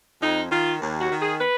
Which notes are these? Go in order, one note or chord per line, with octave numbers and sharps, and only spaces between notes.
F2 D#4
D#3 F4
D#2
F#4
D#3
G#4
B4